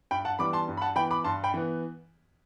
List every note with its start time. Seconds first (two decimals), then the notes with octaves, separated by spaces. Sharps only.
0.11 G2 G5 B5
0.25 F#5 A5
0.39 E3 G3 B3 B5 D6
0.53 A5 C6
0.68 G2
0.77 B5
0.81 F#5 A5
0.96 E3 B3 G5 B5
1.11 B5 D6
1.24 G2 A5 C6
1.44 G5 B5
1.54 E3 B3